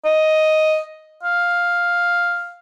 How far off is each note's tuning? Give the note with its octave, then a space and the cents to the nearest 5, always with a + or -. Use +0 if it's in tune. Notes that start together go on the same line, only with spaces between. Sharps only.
D#5 +5
F5 +5